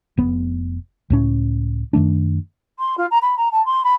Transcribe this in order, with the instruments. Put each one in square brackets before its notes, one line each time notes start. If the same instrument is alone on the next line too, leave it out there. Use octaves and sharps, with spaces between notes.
[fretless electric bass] F1 B3
C#2 A2 C#4
F#2 D#3 A3 D4
[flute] C6
F4
A#5
B5
A#5
A5
C6
B5